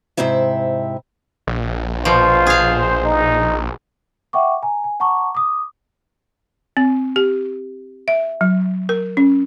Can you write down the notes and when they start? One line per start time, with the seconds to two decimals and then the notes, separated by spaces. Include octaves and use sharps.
0.17 G#2 C3 C4 E4 E5
1.47 A#1
2.05 B2 F3 F4 C5
2.47 G#4 F5
3.05 D#4
4.33 E5 F#5 G5 C#6 D6
4.63 G#5 A#5
4.84 G#5
5.00 F#5 A5 A#5 C#6 D6
5.35 D6 D#6
6.77 C4
7.16 G4
8.08 E5
8.41 F#3
8.89 A#4
9.17 C#4